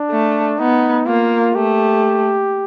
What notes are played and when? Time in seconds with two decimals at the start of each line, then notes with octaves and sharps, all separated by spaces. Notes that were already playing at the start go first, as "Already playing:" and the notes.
Already playing: D4
0.11 A3
0.59 B3 D#4
1.06 A#3 F4
1.55 A3 G4